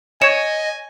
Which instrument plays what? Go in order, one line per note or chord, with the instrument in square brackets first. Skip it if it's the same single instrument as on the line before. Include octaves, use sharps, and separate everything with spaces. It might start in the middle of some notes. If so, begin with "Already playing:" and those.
[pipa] C#5 [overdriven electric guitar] D#5 [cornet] G#5 [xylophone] G#6 E7